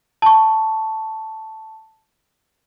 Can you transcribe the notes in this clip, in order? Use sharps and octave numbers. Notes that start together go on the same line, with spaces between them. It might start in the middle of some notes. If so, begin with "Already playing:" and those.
A5 C#6